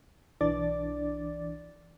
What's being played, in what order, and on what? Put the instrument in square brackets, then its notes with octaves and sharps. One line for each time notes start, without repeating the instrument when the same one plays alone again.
[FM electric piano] B1 E3 D4 D5 D6 A6